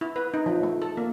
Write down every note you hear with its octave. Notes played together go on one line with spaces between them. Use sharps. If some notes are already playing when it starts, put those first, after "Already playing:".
E4
B4
D#4
F3
A3
A4
A#3